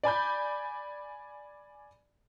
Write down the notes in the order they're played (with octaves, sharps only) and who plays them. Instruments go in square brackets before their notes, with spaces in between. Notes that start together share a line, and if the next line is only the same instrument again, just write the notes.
[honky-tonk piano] D5 G#5 B5 G6